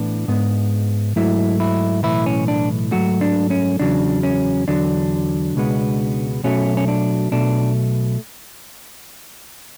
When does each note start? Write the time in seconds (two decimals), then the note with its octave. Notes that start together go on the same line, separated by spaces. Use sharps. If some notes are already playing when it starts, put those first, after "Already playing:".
Already playing: A2 E3 B3 D4
0.28 G#2 G#3 B3
1.16 G#2 F#3 A3 E4
1.60 E4
2.04 B1 A2 E3 E4
2.26 C#4
2.48 D4
2.92 G#2 F#3 A3 F#4
3.21 D4
3.50 C#4
3.80 E2 C#3 F#3 D4
4.23 C#4
4.68 E2 D3 F#3 D4
5.56 C#2 B2 G#3 B3
6.44 B1 B2 F#3 A3 C#4
6.77 C#4
6.88 D4
7.32 B1 B2 A3 D4